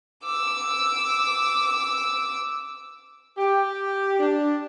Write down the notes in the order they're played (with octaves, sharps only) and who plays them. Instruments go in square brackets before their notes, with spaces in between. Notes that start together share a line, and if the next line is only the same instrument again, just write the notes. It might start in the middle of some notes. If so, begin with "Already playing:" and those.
[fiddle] D6 E6
[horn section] G4
D4